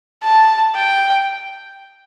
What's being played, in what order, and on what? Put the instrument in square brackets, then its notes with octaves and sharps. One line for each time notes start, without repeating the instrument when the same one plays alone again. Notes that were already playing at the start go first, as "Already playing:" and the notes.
[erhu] A5
G5